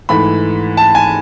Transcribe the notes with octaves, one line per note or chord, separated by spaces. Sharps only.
G#2 E3 A3 B5
A5
G#5